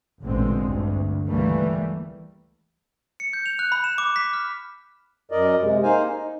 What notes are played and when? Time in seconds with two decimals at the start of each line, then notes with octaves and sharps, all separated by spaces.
0.22 A1 D2 A#2 D3 G#3 C4
0.62 D2 G2
1.28 C#2 E3 G3 A3 A#3
3.20 C#7
3.33 G6
3.46 F7
3.59 F#6
3.72 B5
3.84 E7
3.98 D6
4.16 B6
4.33 F6
5.31 F#2 A#4 D5 D#5
5.61 C3 G#3
5.83 A#3 D#4 C5 F5 G#5
6.08 D#4